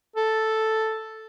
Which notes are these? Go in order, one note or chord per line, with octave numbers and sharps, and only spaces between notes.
A4